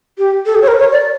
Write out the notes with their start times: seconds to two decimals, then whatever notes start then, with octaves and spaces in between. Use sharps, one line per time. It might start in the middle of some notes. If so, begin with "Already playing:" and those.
0.18 G4
0.46 A4
0.55 G4
0.62 C#5
0.68 A#4
0.79 C#5
0.92 D5